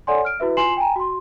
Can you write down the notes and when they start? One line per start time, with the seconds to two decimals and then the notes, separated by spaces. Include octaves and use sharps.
0.07 A4 C#5 D5 F#5 G#5 C6
0.25 F6 D7
0.40 E4 F#4 B4 E5
0.57 F4 G#5 C6 C7 E7 F#7
0.77 G5 G#5 A#5
0.96 F#4 C6